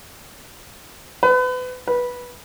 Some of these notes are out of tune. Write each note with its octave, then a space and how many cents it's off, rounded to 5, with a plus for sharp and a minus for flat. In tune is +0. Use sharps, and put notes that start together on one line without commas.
B4 +35
B4 -10